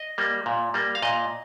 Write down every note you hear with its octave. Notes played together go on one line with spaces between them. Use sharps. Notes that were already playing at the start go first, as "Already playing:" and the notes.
Already playing: D#5
G3 A#3
A#2
G3 A#3
F5
A#2 D#5